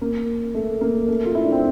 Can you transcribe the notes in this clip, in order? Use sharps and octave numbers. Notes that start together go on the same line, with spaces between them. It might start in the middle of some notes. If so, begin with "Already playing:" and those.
A#3
A3
A#3
A3
F4
E4
D4
C4